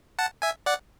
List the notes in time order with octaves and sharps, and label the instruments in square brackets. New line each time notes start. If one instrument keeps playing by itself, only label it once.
[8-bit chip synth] F#5 A5
E5 G#5
D5 F#5